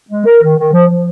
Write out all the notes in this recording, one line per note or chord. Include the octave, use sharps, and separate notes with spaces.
G#3
A#4
D#3
D#3
F3
F3